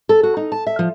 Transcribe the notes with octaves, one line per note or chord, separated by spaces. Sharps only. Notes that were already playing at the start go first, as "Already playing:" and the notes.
A4
F#4
D#4
A5
E5
F3